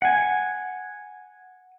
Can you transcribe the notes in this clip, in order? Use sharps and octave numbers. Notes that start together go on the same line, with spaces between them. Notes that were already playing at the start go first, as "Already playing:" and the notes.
F#5 G#5